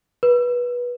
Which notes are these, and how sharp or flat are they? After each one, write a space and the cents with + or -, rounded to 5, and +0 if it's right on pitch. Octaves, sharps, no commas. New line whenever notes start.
B4 -20